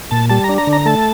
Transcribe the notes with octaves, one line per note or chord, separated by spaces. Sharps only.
A#2 A5
G3 A5
A#5
D4
A#5
D3
A#5
A3 A5